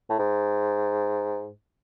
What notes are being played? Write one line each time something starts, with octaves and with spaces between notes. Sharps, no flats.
A2
G#2